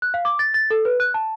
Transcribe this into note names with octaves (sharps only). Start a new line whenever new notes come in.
F#6
F5
D6
A6
A6
A4
B4
F#6
A5